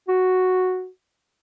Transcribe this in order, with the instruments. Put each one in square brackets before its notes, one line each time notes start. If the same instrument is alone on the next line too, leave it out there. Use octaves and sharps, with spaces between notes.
[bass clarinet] F#4